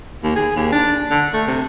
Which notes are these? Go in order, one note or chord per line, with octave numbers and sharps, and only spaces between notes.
D#2
G#4
D#2
D4
D3
A3
C3